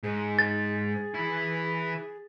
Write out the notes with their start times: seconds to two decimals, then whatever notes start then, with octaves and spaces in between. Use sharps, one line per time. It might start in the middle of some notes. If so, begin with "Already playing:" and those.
0.03 G#2 G#4
0.39 A6
1.14 E3 E4